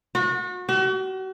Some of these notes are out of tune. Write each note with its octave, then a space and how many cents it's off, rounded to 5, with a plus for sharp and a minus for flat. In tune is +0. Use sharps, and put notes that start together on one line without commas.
F#4 -35
F#4 +40